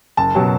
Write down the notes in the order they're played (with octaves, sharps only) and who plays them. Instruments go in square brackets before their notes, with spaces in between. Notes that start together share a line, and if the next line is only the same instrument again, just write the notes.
[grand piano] F#1 A5
B2 F#3